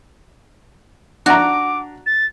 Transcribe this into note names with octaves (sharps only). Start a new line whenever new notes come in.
D4 F#4 F#5 A#5 D6
A6